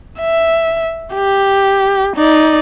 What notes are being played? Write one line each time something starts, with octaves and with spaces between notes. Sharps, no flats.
E5
G4
D#4 D5